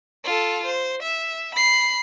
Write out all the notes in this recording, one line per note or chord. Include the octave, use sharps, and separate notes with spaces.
F4 A4
C5
E5
B5 C7